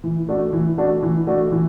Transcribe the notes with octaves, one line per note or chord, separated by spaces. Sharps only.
E3
A3 D4 F#4
E3
A3 D4 F#4
E3
A3 D4 F#4
E3